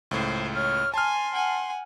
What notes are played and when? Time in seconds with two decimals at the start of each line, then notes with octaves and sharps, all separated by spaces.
0.11 C#2 A2 C5
0.54 C#5 F6
0.94 G#5 A5 C6 F6
1.33 F#5 G#5